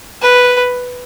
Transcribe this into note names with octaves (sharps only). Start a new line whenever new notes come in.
B4